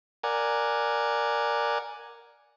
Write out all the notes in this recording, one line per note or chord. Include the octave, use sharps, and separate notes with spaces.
A#4 D5 F#5 G#5